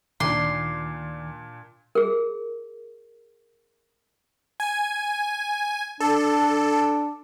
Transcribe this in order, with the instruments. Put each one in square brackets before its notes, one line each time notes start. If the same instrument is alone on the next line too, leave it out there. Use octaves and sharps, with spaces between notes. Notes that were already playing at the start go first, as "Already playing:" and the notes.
[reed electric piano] D2 D#3 D6 [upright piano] A#2 D4 [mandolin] C6
[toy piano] G#4 A#4
[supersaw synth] G#5
[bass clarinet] D4 [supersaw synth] A4